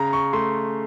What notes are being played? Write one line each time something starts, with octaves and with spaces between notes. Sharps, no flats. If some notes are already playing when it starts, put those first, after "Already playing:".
Already playing: C#3 A#5
C#6
A3 C6